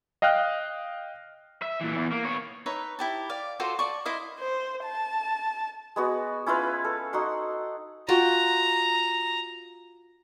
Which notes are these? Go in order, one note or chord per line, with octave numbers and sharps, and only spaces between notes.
D#5 F5 G5 F6 F#6
E5
A#2 E3
E2
A#3
B3 C#5
D#4 B4 C#5 E5
E4 G4 A5
D5 F5
F4 F#4 A4 C5
D5 A5 C#6
E4 C5 D#5 F5
C5
A5
G#3 B3 F#4
C#4 E4 F4 B4
A4
D#4 F#4 F#5 C6
F4 F#4 G5 A#5